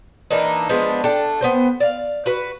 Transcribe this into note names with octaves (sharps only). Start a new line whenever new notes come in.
E3 A#3 D4 D#4
F3 G#3 B3 D4
A3 D4 G5
B3 C5 G5
D5 F5
F#4 B4